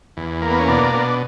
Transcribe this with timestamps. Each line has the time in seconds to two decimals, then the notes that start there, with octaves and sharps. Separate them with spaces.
0.17 E2
0.42 A#3
0.50 B3
0.59 C#4
0.68 B2 D4
0.94 B2